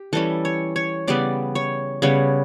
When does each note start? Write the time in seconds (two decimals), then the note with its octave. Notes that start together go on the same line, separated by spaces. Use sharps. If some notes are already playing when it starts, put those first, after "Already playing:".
Already playing: G4
0.13 E3 G3 C#4 A4
0.45 C#5
0.76 C#5
1.08 C#3 G3 B3 D5
1.55 C#5
2.02 C#3 G3 B3 C#5